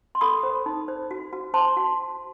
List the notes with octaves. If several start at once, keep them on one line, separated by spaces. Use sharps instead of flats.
C6
A4 B5 D#6
C5
D#4
C5
F#4
F#4
C5 A5 C6
F#4